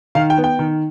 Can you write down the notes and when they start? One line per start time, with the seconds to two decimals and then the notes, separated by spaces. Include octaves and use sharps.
0.15 D#3 F5
0.30 G5
0.37 B3
0.44 G5
0.59 D#3